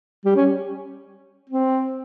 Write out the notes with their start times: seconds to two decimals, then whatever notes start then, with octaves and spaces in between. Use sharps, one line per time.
0.25 G3
0.36 C#4
1.49 C4